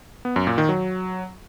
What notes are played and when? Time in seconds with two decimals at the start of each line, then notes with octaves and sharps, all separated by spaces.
0.25 B3
0.36 F#2
0.47 A#2
0.58 D#3
0.69 F#3